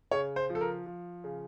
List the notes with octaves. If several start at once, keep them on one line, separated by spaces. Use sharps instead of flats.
C#3 C#5
C5
F3
A4
A#4
F3
C#3